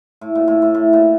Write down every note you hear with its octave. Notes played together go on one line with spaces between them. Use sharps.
A2
A#2
A2
A2
A2
A#2